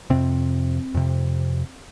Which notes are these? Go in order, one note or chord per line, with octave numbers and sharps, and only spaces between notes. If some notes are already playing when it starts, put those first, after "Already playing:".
F2 C3 C4
F2 C3